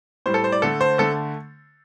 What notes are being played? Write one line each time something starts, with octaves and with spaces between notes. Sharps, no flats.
A2 G3 C5
A4
C5
D5
D3 A3 A4
C5
D3 A3 A4